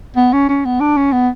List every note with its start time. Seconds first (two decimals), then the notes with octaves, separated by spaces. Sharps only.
0.16 B3
0.33 C#4
0.48 C#4
0.65 B3
0.80 D4
0.97 C#4
1.12 B3